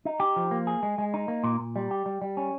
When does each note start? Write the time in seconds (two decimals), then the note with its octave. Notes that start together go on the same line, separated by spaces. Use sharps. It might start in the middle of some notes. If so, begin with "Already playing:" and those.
0.05 D#4
0.20 G4
0.36 F3
0.51 A#3
0.67 G#4
0.83 G#3
0.98 G#3
1.14 D#4
1.28 A#3
1.44 A#2
1.60 A#2
1.76 G3
1.91 G4
2.06 G3
2.22 G3
2.37 C#4